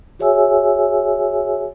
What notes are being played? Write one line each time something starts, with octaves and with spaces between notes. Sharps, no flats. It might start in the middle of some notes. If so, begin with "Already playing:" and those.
F#4 G#4 C#5 E5 G#5 E6